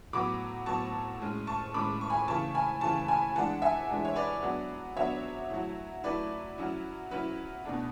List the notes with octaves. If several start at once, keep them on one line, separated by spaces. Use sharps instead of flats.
A2 F#3 B3 B5 D6
A2 F#3 B3 A5 C#6
A2 G#3 C#4
A5 C#6
A2 G#3 C#4 B5 D6
C#6
G#5 B5
C#3 E3 A3 A5 C#6
G#5 B5
C#3 E3 A3 A5 C#6
G#5 B5
E3 G#3 D4 F#5 A5
E5 G#5
E3 G#3 D4
C#5
B4 D5
F#3 B3 D4
F#3 B3 D4 C#5 E5
F#3 A3 E4
F#3 A3 E4 B4 D5
F#3 C#4 E4
F#3 C#4 E4 B4
B2 A3 D4